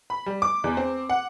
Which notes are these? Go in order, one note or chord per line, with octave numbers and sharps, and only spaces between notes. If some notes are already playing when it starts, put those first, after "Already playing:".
B5
G3
D6
E2
C4
F#5